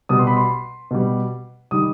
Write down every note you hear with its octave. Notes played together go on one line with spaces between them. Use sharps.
B2 G3 D#6
C6
B5
C6
B2 G3
D#3 G3 D#6